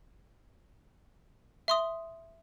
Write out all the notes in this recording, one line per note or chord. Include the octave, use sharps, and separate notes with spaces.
E5 C6 D#6